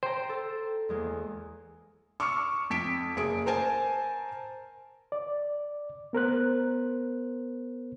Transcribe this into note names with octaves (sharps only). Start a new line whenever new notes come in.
C5 G5 A#5
A4
E2 G#3 A#3
C#6 D6 E6 F6 C#7
F2 B6 D7
F#1 G#4 D7
A#4 C5 G#5 A5
D5
B3 A#4 C5 F#6